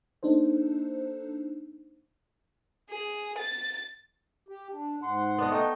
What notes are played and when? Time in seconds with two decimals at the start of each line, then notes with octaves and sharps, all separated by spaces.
0.23 A#3 D4 D#4 A4 C5
2.90 G#4
3.38 A6
4.48 G4
4.73 D4
5.02 G#2 F#5 C6
5.38 B3 D4 D#5
5.51 A3 D#4 G5